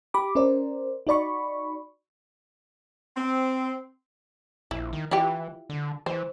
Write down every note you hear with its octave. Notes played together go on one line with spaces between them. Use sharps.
G4 B5 D6
C#4 A#4 C5 D5
D#4 F#4 D5 B5 C#6
C4
A#1 E4
D#3
E3 E4 F4 G4
D3
E3 C5